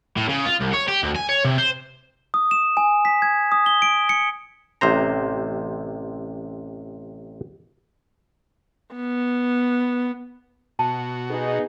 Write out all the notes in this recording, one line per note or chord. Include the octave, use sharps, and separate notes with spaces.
A2
C#3
F4
C2
C#5
G4
D2
G#5
C#5
C3
C5
D#6
E7
G#5
B6
G#6
D#6
G7
D7
C#7
A1 C3 C5 A#5
B3
B2 F#4 A5
B3 D#4 G#4